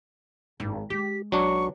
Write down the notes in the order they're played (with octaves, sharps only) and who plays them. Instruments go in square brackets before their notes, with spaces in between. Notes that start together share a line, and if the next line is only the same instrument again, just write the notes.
[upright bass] G#1 [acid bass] G2
[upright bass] G#3 [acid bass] G4 [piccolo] B6
[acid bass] B1 [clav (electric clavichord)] F#3 D4 [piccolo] C#6